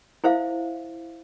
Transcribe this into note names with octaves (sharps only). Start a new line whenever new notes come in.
E4 C5 E5 F5